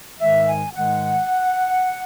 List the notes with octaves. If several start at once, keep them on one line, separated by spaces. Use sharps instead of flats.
G#2 D#3 G#3 E5
G#5
G#2 D#3 G#3 F#5